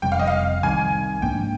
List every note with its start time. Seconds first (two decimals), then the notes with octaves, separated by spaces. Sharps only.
0.02 F1 F2 C3 G3 G5
0.12 F5
0.19 D#5
0.27 F5
0.63 C2 C3 D#3 G3 G#5
1.22 G#2 F3 A#3 D4 G5